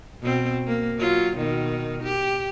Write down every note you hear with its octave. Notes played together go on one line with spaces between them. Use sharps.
B2 C4
A#3
F#3 F4
B2 D#3
G4